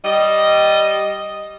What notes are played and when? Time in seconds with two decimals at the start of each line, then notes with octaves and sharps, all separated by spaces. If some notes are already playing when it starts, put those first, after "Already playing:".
0.05 G3 D#5